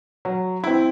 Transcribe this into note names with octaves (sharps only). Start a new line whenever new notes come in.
F#3
C4 E4